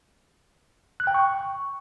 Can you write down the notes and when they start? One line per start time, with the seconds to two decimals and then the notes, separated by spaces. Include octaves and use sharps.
1.00 F#6
1.07 G5
1.14 C#6